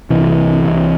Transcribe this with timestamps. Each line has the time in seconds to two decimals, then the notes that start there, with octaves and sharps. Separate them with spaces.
0.10 C2 C3 E3
0.64 C2 C3